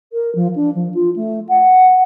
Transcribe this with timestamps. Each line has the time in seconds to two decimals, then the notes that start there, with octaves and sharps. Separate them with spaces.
0.12 A#4
0.35 F3
0.55 D4
0.74 F3
0.94 F4
1.16 A3
1.48 F#5